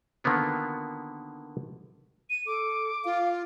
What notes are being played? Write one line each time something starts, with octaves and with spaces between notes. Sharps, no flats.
D3 D#3 A#3 B3 F4
D#7
A4 D6
F4 F5